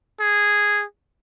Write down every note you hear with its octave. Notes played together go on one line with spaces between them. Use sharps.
G#4